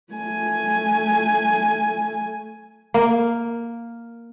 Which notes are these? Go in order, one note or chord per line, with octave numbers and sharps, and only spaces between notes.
A3 G#5
A#3